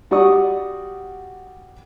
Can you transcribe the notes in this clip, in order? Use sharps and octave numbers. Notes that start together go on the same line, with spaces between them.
G3 F#4 G4 D5 C#6 D#6